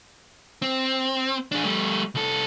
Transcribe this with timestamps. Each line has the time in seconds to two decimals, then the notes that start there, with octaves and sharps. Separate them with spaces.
0.62 C4
1.52 D4 G#4
1.64 G3 A3
2.15 C2 A4